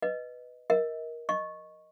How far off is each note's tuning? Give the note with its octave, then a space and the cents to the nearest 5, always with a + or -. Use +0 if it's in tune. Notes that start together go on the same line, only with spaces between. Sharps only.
B4 +0 D#5 +0
A#4 +15 D#5 +35
D#5 +0 C#6 -10